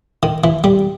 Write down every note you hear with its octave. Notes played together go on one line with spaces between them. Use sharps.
D#3
E3
G3